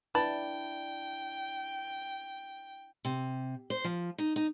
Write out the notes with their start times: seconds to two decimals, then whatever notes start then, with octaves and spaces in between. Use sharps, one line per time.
0.15 D4 E4 B4 G5 A5
3.05 C3
3.70 C5
3.84 F3
4.18 D#4
4.36 D#4